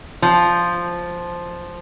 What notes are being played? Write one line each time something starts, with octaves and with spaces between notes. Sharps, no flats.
F3